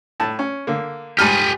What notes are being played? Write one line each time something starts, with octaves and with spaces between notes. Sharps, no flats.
A2 A5
C#4
D3 A#3
G#2 G3 G4 G#5 F6